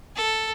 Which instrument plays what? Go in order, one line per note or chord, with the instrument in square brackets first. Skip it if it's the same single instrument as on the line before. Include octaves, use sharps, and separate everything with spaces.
[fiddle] A4